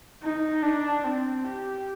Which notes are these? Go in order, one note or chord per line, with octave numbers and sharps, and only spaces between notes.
D#4
D4
C4
G4